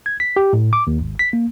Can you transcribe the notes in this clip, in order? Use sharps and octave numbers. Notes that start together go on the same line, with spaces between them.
G#6
B6
G4
A2
D6
D#2
G#1
B6
A#3